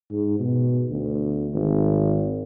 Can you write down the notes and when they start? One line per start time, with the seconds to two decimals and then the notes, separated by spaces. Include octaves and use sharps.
0.11 G#2
0.40 B2
0.90 D2
1.54 G#1